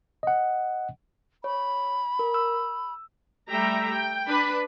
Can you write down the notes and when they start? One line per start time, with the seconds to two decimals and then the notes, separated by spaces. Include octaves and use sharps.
0.23 D#5 F#5
1.44 C#5 B5
2.19 A#4
2.34 E6
3.50 G3 A3 E5 G5 A#5
3.91 G5
4.28 D4 B4 B5